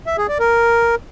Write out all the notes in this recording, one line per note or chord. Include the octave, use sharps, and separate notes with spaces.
E5
G#4
D5
A#4